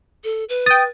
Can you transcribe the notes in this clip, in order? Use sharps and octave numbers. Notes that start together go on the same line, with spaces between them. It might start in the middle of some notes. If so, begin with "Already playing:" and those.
A4
B4
G5 D#6 A6